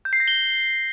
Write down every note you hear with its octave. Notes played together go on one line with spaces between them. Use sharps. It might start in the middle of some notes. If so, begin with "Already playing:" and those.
G6
C7
A#6
G7